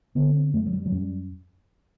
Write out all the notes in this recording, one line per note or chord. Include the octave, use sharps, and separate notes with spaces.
D3 B3
C4
F#2 A3
F#3
G3
F#3
F#2 G3